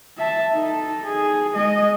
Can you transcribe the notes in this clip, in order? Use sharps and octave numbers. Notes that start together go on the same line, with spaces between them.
E5 A5
D#4 A4
G#4
G#3 D#5